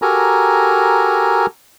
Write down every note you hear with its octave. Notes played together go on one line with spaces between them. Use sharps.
F#4 G4 A4 A#4 G#5 A#5